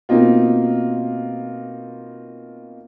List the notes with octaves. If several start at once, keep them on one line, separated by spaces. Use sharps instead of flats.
B2 A#3 C4 D#4 F4